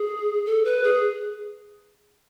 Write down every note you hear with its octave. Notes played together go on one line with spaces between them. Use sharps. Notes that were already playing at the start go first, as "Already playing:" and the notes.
Already playing: G#4
A4
B4
G#4